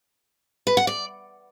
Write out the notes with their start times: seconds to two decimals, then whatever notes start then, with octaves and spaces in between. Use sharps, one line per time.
0.67 B4
0.77 F#5
0.87 D5